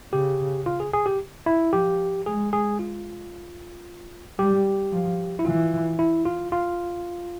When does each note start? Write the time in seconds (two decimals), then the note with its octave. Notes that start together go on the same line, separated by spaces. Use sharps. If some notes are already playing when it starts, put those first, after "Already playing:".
0.13 C#3 G4
0.66 F4
0.80 G#4
0.94 G#4
1.06 G4
1.46 E4
1.73 F3 G4
2.26 G#3 G#4
2.53 G#4
2.79 F4
4.39 G3 G4
4.92 F3
5.39 E4
5.45 E3 F4
5.99 E4
6.25 F4
6.52 F4